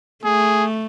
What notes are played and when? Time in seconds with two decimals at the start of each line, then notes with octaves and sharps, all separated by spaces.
0.25 A3 G#4